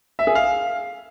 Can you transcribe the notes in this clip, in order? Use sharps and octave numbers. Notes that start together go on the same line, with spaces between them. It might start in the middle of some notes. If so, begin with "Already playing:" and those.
E5
G#4
F5